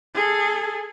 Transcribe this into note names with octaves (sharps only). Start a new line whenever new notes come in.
G#4 A4